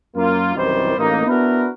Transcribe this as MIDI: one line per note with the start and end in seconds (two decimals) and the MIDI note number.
0.16 0.56 42
0.16 0.56 58
0.16 0.56 65
0.56 0.93 36
0.56 0.93 42
0.56 0.93 51
0.56 0.93 52
0.56 0.93 55
0.56 0.93 72
0.97 1.25 33
0.97 1.25 58
0.97 1.25 63
1.26 1.68 59
1.26 1.68 62
1.26 1.68 64
1.26 1.68 66
1.26 1.68 70
1.26 1.68 71